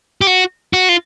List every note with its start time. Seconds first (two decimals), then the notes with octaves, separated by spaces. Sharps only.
0.21 G4
0.27 F#4
0.73 F#4
0.89 F4